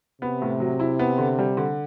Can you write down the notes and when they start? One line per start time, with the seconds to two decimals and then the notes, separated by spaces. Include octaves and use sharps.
0.22 C3 B3
0.42 A2
0.60 F#3
0.80 E4
0.99 B3
1.18 D3
1.39 G3
1.57 D3